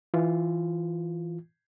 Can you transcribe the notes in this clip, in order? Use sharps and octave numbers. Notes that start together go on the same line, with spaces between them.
E3 F4